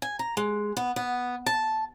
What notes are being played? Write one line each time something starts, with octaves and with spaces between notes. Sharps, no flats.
G#5
A#5
G#3
B3
B3
A5